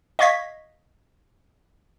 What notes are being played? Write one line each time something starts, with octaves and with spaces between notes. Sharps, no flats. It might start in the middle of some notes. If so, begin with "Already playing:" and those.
D#5 F5 C#6 G#6 A#6 B6